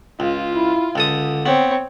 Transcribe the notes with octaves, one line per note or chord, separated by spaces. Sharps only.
C#2 F4
E4
C#2 D3 A4 D#6
B3 C4 C#5